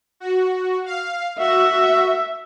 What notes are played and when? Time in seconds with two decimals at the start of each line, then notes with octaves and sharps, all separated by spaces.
0.20 F#4
0.86 F5
1.39 F#4 E5